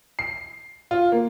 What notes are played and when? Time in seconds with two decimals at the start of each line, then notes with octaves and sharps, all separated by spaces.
0.19 C7
0.91 F4
1.12 A#3